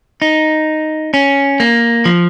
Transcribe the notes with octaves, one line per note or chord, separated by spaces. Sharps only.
D#4
C#4
A#3
F3